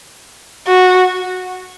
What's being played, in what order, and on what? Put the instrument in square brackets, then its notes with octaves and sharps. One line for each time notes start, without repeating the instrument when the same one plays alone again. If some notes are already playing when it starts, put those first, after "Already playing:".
[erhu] F#4